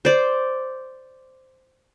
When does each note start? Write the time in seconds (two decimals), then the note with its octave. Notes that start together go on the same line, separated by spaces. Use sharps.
0.05 C5 D5